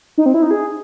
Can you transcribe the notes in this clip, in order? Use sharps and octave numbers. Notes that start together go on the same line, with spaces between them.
D#4
C4
E4
D#4
G#4